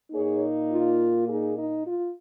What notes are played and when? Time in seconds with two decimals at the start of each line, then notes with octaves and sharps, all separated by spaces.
0.12 A#2 A#3 D#4 G#4 C#5
0.70 F4
1.27 D#4 G#4
1.56 D#4
1.85 F4